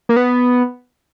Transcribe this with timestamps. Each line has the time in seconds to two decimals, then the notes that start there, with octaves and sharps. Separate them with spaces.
0.09 A#3
0.16 B3